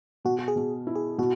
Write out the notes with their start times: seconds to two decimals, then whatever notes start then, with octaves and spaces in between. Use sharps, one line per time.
0.25 B2 F#4
0.39 F#4
0.48 G#4
0.56 B2
0.87 E4
0.95 G#4
1.18 B2 F#4